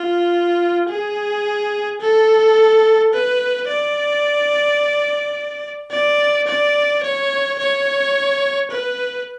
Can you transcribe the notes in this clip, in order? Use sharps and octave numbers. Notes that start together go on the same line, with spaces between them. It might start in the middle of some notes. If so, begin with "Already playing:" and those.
Already playing: F4
G#4
A4
B4
D5
D5
D5
C#5
C#5
B4